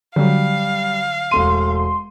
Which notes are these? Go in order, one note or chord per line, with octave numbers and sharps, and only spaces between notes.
D3 F#3 G3 F5
E1 A3 C6 D#7